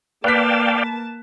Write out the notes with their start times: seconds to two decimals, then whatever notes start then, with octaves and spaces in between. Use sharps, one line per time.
0.24 A#3 B4 D5 F5 G5 A5 F#6 B6